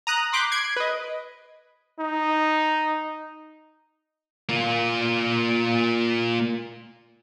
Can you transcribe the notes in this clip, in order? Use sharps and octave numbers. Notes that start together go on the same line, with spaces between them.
A#5 D#6 F#6
B5 C6 D6 F#6 G6 B6
G#6 C7 D7
B4 D#5
D#4
A#3 F4